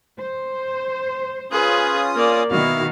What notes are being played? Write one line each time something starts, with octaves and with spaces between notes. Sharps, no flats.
C5
C#4 F4 G#4 B4 D#6
A#3 D5
B2 D#3 B3 E4 F#4 F5